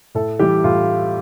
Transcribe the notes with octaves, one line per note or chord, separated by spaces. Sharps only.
A2 A4
E3 G3 G4
A2 F4